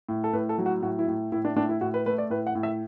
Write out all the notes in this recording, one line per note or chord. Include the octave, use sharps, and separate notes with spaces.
A2
A4
A2 B4
A4
F#3
F#4
A2 F#4
E4
A2
A2 E4
D4
A2 D4
E4
A2 F#4
B4
A3 B4
D5
A2 B4
F#5
A2
E5